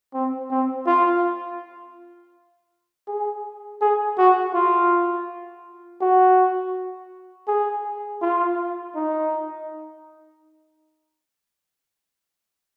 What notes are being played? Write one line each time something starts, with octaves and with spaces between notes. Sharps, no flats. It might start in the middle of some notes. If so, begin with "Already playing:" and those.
C4
C4
F4
G#4
G#4
F#4
F4
F#4
G#4
F4
D#4